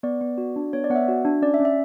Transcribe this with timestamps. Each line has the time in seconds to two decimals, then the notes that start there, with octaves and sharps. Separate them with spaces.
0.03 B3 D5
0.21 B3
0.38 F#4
0.56 D4
0.73 B3 C#5
0.84 D5
0.90 B3 F#5
0.96 E5
1.08 F#4
1.25 D4
1.42 C#4 D5
1.54 E5
1.60 C#4
1.65 E5